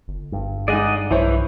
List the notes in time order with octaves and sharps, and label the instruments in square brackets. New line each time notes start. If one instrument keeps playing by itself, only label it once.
[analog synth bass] G1
[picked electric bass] G2
[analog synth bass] G#3 [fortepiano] D#4 G#4 [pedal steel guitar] D5 D#5 F#5
[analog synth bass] B1 [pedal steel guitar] E3 [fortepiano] E4 C5 C#5